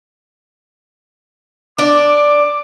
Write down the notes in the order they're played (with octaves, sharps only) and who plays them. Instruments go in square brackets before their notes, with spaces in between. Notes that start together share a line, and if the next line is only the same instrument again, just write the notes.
[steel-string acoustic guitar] D4 D5 [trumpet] D6